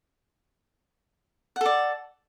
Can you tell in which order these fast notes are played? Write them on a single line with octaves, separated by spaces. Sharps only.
F#5 A4 D5